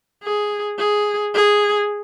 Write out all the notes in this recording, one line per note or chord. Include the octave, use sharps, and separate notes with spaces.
G#4
G#4
G#4